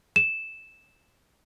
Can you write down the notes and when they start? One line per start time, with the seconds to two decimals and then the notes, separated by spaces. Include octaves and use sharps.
0.16 E7